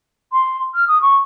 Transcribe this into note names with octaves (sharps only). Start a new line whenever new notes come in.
C6
F6
D#6
C#6